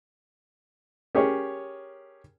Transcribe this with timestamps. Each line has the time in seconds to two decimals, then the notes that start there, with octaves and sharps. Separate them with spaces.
1.15 C#4 G4 G#4 A#4 C#5